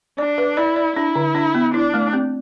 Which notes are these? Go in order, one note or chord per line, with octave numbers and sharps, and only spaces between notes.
D4 D5
B4
E4 D5
D5
D4 E4
D3
D4
B3
D4 E4
A3
C4